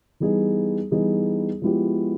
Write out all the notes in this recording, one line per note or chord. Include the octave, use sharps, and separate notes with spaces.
E3 G3 B3 D#4 G#4
E3 G3 B3 D#4 G#4
F3 G#3 B3 E4 G4